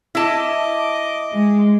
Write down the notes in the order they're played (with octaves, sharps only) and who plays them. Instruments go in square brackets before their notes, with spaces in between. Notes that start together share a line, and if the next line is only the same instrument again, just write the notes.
[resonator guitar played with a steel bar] E4 A5 [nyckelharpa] D#5 D6
[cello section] G#3